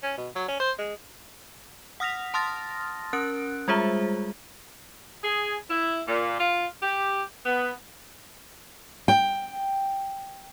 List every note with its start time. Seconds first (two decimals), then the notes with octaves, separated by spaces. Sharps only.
0.03 C#4
0.18 B2
0.35 F#3
0.48 C#4
0.60 C5
0.79 G#3
2.00 F#5 D#6 F6 A#6 B6 F7
2.34 A5 C6 D#6 F6 A6 A#6
3.13 C#4 A#4 F#6 D7
3.68 G3 G#3 F4 G#4 C5 E5
5.24 G#4
5.70 E4
6.07 A#2
6.39 F4
6.82 G4
7.45 B3
9.08 G5